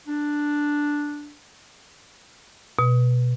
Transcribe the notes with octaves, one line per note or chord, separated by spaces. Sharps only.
D4
B2